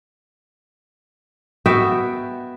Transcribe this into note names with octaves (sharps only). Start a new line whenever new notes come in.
B3 F#4 E5 G5